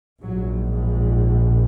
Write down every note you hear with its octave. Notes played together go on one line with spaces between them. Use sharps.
A#1 G#2 F#3